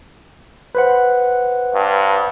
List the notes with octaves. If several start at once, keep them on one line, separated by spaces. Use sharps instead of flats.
B4 C5 F#5
G2